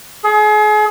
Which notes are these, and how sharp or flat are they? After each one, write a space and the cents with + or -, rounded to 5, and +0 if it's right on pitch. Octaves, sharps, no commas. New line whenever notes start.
G#4 +35